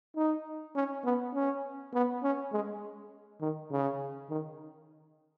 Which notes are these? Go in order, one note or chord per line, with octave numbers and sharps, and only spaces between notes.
D#4
C#4
B3
C#4
B3
C#4
G#3
D#3
C#3
D#3